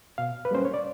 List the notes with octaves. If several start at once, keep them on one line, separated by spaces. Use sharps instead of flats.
B2 F5
B4
G3 A#3 C#4 C5
C#5
D5